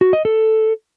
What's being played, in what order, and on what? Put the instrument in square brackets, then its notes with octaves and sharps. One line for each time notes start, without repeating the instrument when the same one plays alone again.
[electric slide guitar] F#4
D#5
A4